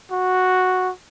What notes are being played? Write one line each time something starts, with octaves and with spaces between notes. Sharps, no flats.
F#4